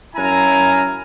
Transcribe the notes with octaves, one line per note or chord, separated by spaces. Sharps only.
F#2 E4 F5 G#5 A#5